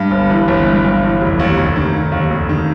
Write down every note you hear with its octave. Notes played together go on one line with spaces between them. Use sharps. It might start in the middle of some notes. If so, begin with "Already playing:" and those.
Already playing: G2
G1
E3
G1
G2
G1
E3
F1
D#2
F1
D#3
F1
D#2
F1
D#3